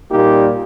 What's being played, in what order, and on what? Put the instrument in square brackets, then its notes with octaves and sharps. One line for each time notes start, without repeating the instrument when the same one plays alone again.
[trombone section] A#2 G3 A#3 D#4 G4